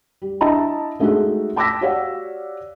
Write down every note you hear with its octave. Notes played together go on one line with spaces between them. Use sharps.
G3
D4 E4 D#5 A5 A#5
G#3 A3 C#4 D#4 F#4 G#4
G5 A5 D6 E6 A#6 B6
F#4 G4 C#5 D5 F5 F#5